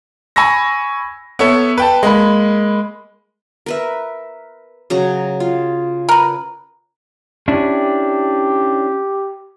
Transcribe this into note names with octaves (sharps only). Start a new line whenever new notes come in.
G#5 B5 C#6 E6 A#6
B3 A4 C#5 E5
B4 G5 A5
G#3 A#3 B5
A#4 B4 E5
C#3 F#3 A#5
F4
A#4 B4
C#4 D4 E4 G4